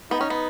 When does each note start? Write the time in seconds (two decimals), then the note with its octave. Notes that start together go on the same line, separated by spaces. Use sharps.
0.11 B3 D#4
0.21 C#4
0.30 B3